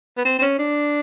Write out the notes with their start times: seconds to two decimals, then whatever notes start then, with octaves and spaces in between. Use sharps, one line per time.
0.17 B3
0.25 C4
0.39 C4
0.42 C#4
0.59 D4